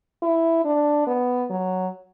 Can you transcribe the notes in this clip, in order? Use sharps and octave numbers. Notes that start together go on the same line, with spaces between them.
E4
D4
B3
F#3